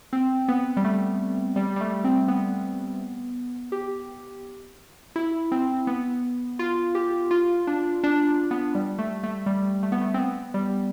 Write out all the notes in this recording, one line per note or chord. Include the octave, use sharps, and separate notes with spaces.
C4
B3
G3
A3
G3
G3
A3
C4
B3
G4
E4
C4
B3
F4
G4
F4
D4
D4
B3
G3
A3
A3
G3
A3
B3
A3
C4
B3
G3